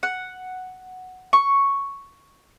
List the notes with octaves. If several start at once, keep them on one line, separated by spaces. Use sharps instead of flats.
F#5
C#6